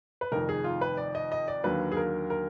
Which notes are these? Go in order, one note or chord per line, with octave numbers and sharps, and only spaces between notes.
B4
F1 F2 D#3 A#4
G#4
F4
B4
D5
D#5
D#5
D5
D#2 D3 F#3 A#3 B4
G#4
A#4
A#4